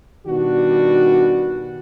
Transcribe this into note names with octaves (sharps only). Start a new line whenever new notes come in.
B2 D#3 G3 D4 F#4